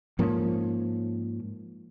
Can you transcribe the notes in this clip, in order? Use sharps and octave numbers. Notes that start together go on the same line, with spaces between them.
G#2 F3 A#3 C#4